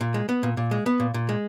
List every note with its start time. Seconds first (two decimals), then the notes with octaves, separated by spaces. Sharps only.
0.01 A#2
0.14 G#3
0.29 B3
0.43 A#2
0.57 A#2
0.71 G#3
0.86 B3
1.00 A#2
1.14 A#2
1.29 G#3